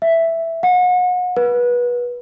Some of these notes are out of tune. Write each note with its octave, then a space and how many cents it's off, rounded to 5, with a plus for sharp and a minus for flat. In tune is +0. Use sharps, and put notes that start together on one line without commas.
E5 +0
F#5 -35
B4 -25